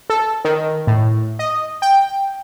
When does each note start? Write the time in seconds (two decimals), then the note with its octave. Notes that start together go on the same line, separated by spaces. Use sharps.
0.10 A4
0.45 D#3
0.87 A2
1.39 D#5
1.82 G5